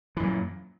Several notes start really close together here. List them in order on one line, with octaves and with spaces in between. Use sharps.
E3 F#2 A#2